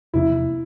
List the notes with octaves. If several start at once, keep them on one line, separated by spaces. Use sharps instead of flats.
E2 C3 F3 A#3 E4